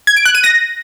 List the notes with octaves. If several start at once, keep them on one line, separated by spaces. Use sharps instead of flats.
G#6
D7
F#6
D#7
A#6